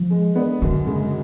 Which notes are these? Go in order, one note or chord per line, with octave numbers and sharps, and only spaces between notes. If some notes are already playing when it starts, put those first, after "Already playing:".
Already playing: F3
G#3
B3 D4
F#2 D3
C#3 G#3